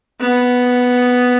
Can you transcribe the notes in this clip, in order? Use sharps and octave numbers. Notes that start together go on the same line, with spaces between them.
B3